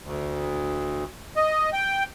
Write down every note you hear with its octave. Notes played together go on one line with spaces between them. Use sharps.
D2
D#5
G5